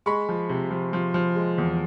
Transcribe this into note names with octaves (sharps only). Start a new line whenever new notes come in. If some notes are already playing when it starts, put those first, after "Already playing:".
G#3 B5 C#6
F3
C3
F3
F3
F3
G#3
E2